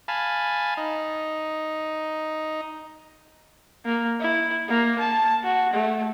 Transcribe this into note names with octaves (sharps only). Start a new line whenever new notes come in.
F5 G#5 A5 B5
D#4
A#3
E4
A#3
A5
F#4
A3